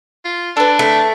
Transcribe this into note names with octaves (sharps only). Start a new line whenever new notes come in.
F4
D4 A4 B4
A3